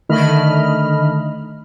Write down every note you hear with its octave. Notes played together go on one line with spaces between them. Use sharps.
D3 D#3 A3 D#5 B5 F6